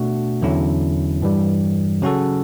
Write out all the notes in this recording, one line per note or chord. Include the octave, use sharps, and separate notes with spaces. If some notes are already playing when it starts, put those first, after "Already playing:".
Already playing: B2 A3 D4 F#4 A4
E2 D3 F#3 C#4 E4
G2 E3 G3
C#3 F#3 C#4 F#4 A4